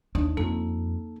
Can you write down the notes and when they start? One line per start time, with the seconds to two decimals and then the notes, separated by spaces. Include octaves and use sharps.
0.15 D#2 D4 D#4
0.37 F2 A#3 A4